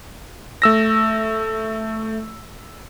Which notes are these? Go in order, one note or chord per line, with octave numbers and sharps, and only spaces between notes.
A3 E6 A#6